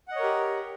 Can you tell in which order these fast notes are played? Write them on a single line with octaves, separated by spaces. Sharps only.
F#5 D#5 C#5 A#4 G4